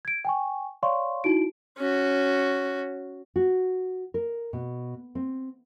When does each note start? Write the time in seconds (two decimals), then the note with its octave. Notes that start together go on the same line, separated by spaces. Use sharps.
0.05 G#6 D7
0.25 G5 G#5 C#6
0.83 C#5 D5 F5 C6 C#6
1.24 D#4 E4 F#4 D7
1.78 C#4 F#4
3.36 F#4
4.14 A#4
4.53 B2
5.15 C4